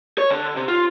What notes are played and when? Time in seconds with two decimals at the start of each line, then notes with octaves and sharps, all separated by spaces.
0.18 C#5
0.30 D3
0.56 C3
0.68 F4